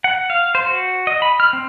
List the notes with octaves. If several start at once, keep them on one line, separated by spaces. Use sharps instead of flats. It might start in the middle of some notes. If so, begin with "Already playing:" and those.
F#5
F5
C5
F#4
D#5
B5
F6
C4